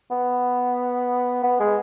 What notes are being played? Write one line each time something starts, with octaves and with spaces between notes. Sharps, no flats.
B3
B3
G#3